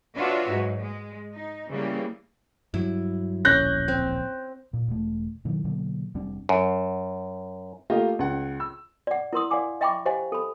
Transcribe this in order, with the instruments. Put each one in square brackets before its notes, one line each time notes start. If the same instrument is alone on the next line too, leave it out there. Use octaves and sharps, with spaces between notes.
[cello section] D4 F4 F#4 B4 C#5 E5
G#2 F#3
G#3
D#4
C#3 E3 G3 A#3
[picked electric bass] G2 F#3 [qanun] E4
[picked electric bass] D1 A#1 [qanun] C#4 [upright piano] F#6 G6 A#6
[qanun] C4
[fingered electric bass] A#2
E1 A3
B2 D#3 E3 F#3
B2 D3 F#3 A#3
F1 G3 C4 D4
[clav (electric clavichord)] F#2
[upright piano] A3 A#3 F4 G4 D#5
C#2 F#5
E6
[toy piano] D5 F#5
E4 A#4 C6 D#6
D5 F5 F#5 G#5 D6
D#5 E5 G5 B5 C#6 D6
G4 C5 D#5 F5 G#5
A4 B5